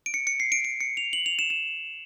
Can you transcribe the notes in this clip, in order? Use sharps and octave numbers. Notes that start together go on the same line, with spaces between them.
D7
C#7
C#7
C7
D7
D7
C#7
F7
F#7
F7
E7
E7